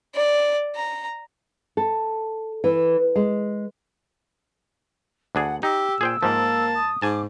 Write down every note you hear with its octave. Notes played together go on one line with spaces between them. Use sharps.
D5
A#5
A4
E3
G#3
D2 D4 G#4 F#5
D#4 G4 E6
A#2 G#4 C5 G5
G#2 F3 A#3 A5
D#6
G#2 G#5 A5 D6